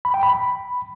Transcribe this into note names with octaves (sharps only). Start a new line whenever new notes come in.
B5
G5
B5